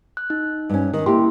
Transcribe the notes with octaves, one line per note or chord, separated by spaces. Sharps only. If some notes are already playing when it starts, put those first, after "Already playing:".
F#6
D#4
G2 C#4
D#3
A#3 E4 G4 C6